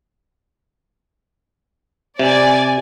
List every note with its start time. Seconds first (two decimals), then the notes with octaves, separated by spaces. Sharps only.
2.19 C3 D5 G#5